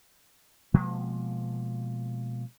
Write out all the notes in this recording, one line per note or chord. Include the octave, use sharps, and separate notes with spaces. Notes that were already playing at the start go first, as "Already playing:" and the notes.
B2 F3 G#3 A#3